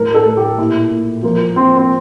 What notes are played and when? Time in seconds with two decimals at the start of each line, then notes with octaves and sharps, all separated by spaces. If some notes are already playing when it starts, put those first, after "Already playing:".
Already playing: A2 G3 A#4
0.15 A4
0.26 A2
0.37 G4
0.58 A#2 E4
0.91 A#2
1.23 F3 A#3
1.56 F3 C4
1.77 C4